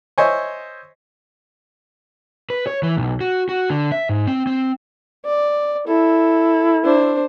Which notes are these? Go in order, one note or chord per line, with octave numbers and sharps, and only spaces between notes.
C5 C#5 D#5 E5 G#5 C#6
B4
C#5
E3
B1
F#4
F#4
D3
E5
G#2
C4
C4
D5
E4 A4
D4 C5